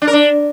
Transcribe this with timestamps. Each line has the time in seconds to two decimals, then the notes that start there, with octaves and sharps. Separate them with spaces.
0.02 D4
0.07 A#4
0.13 D4